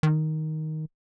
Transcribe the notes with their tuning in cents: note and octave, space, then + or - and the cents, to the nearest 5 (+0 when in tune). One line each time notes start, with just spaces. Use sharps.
D#3 +5